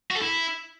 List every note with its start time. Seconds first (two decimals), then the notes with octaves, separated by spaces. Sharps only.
0.11 F#4
0.16 A4
0.21 E4